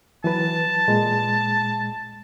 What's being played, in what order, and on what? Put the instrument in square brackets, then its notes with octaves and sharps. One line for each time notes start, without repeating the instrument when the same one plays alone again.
[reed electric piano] E3 F#3 B4 [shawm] A5
[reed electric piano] A#2 G#3